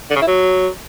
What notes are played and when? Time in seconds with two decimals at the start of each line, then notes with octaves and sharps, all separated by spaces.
0.11 D3
0.16 C#3
0.22 E4
0.27 F#3